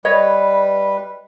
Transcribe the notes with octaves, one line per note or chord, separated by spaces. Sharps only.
G3 B4 C#5 D#5